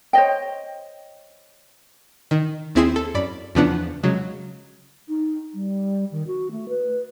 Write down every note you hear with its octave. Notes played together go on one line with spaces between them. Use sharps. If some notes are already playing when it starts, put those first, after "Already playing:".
C5 C#5 D#5 G5
D#3
D#2 C4 E4 G#4 C6 E7
A4
F#2 D5 B5
E2 C#3 F3 B3 D4 F#5
C#3 F#3 G#3
D#4
G3
D#3
F#4
A3
B4